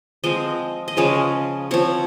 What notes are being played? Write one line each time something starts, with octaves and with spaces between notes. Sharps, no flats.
F3 G#3 C4 D#5
D#5
C#3 F3 G#3 C#4 F5
F3 C4 C#5